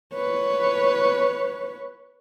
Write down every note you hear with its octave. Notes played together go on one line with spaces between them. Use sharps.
B4 C#5